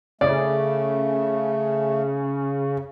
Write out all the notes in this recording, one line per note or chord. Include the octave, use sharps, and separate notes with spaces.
C#3 A3 D5